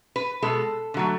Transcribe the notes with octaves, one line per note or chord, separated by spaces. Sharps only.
B4
B2 G#3 A4
D3 F#3 A3